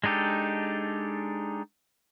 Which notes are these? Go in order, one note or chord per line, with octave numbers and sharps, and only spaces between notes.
G#3 D4 D#4 G4 A4